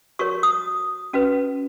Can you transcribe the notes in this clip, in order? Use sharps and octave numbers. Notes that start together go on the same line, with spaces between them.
F#4 A#4 C#5 C#6
D#6
C#4 F#4 B4